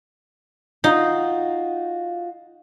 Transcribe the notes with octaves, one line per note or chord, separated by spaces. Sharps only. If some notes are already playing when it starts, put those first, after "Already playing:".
D#4 F4 F#4